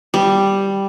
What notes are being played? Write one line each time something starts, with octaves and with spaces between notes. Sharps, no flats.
G3